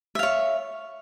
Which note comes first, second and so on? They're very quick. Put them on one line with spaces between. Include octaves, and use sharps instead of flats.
E5 F5 C#5